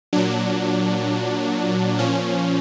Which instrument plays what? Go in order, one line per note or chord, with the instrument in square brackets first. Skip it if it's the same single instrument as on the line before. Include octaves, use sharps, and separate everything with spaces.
[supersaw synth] A#2 F#3 D4
A#2 F3 C#4